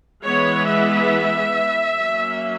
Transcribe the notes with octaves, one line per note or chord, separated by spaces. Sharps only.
E3 G#3 B3 C#5
E5
F#3 A#3 C#4